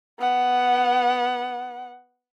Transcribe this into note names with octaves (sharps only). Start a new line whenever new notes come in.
B3 F#5